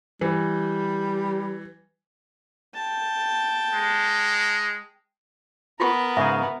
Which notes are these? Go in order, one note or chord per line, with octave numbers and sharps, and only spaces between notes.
E3 G3
G5 A5
G#3
B3 F4 A#4 C#6
G#2 C#3 G#4 E5